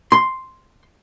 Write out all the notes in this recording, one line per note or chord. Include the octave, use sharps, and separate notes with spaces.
C6